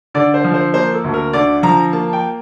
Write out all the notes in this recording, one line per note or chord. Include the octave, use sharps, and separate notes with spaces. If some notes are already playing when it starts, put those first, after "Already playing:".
D3 D5
C5
F3
C5
A#3 C5
A4
D2
A#4
D3 D5
F3 A#5
A#3 A5
G5